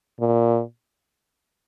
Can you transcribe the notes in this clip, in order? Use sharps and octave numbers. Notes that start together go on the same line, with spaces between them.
A#2